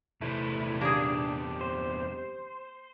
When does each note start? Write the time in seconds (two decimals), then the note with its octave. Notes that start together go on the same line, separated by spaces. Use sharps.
0.21 E2 C3 A3 E4
0.81 A#3 D4 G4 G#4
1.61 C5